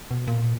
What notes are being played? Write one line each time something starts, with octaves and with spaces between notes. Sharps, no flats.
B2
A#2